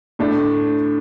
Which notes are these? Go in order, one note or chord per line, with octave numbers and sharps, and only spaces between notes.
A2 A3 D4